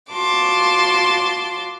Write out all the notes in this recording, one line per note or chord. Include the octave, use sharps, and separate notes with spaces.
F4 F#4 A5 C6 D6